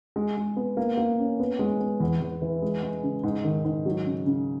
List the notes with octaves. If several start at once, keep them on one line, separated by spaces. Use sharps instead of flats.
G#3
G#3
B3
A#3
A#3
C#4
B3
G#3
B3
E2
E2
E3
G#3
G#3
C#3
G#2
D#3
G#2
F#3
C#3
C#3